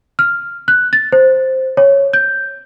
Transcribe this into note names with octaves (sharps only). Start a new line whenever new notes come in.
F6
F#6
A6
C5
C#5
G6